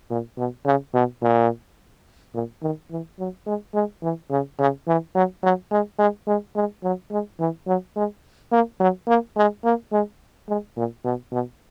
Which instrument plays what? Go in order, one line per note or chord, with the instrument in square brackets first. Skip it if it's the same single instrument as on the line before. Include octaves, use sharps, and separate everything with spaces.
[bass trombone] A#2
B2
C#3
B2
A#2
A#2
D#3
E3
F#3
G#3
G#3
E3
C#3
C#3
E3
F#3
F#3
G#3
G#3
G#3
G#3
F#3
G#3
E3
F#3
G#3
A#3
F#3
A#3
G#3
A#3
G#3
G#3
A#2
B2
B2